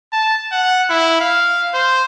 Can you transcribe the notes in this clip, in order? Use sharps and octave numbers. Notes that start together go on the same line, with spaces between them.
A5
F#5
E4
F5
C5